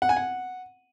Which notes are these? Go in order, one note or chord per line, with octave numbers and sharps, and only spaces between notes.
F#5
G#5
F#5